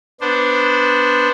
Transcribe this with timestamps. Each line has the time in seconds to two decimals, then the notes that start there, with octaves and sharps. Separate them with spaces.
0.21 B3 D4 C5